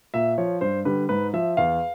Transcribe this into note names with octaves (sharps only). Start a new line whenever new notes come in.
A#2 E5
F3 C#5
G2 C5
D3 G3 B4
G#2 B4
F3 E5
E2 F5